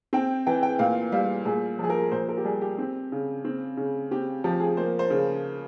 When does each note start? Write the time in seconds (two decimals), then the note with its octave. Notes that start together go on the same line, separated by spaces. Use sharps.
0.13 C4 G5
0.47 E3 G5
0.63 G5
0.79 A#2 F5
1.12 G3 F5
1.45 A#2 G#4
1.79 F3 G#4
1.90 A#4
2.12 A#2 C5
2.29 A#4
2.38 G4
2.45 G3 G#4
2.62 G4
2.78 C4
3.12 C#3
3.45 C4
3.77 C#3
4.11 C4 G4
4.44 F3 G4
4.60 G#4
4.77 A#3 C5
4.99 C5
5.10 C#3